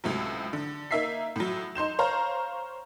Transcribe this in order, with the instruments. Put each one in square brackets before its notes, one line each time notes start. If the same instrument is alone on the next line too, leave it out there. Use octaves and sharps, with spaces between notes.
[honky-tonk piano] C#2 A2 C3 F#3
D3
A#3 D#4 E5 B6 C7
A2 F#3
D#4 C6 G6 E7
C5 C#5 F5 A#5